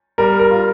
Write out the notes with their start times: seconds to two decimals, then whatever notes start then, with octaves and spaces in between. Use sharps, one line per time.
0.18 G3 A#4
0.40 A#4
0.51 F4